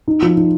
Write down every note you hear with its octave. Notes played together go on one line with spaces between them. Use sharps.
D#4
F3
D#4